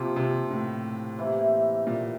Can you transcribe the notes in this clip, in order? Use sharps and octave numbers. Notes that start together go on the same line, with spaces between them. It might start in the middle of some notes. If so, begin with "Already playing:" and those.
Already playing: C3 F3 A#3 F4
C3
A2
C3 E3 A#3 E4
A#2